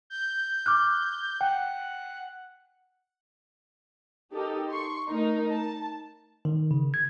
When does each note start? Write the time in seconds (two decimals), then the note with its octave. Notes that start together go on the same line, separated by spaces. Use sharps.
0.10 G6
0.66 D6 F6 F#6
1.41 F#5 G5
4.31 D#4 G4 A4 A#4
4.70 C6 C#6
5.09 A3 D#4 A#4
5.51 A5
6.45 D#3
6.71 C#3
6.94 G#6